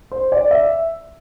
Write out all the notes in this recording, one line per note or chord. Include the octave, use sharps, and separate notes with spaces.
C5
D5
E5